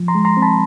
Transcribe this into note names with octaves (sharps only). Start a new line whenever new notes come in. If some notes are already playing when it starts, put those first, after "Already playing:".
Already playing: F3
A#5 C6
G#3
A#5 C6
C4
A5 B5